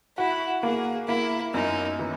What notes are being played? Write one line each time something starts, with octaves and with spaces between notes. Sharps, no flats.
E4 F#4
A#3 G#4
A#3 E4
F#2 D#4
E3